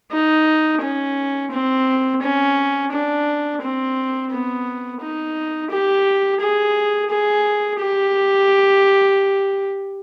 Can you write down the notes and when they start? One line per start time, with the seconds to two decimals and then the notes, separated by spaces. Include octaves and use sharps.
0.12 D#4
0.82 C#4
1.51 C4
2.22 C#4
2.92 D4
3.62 C4
4.31 B3
5.01 D#4
5.71 G4
6.41 G#4
7.10 G#4
7.80 G4